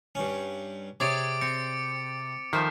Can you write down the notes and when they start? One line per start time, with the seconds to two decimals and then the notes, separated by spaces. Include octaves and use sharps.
0.15 G2 C#4
1.00 C3 G#4 C#5 D5 D6 A6 D7
1.41 C4 C#7
2.53 D#3 F3 A3 C5 E5